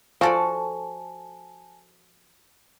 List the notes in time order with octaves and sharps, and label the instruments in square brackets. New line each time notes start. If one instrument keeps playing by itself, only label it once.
[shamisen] F3 [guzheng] F#4 A4 D5 [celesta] G#5 A5